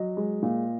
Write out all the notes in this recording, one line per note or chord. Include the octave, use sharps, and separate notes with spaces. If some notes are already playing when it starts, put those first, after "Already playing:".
Already playing: F#3 D#5
G#3
A#2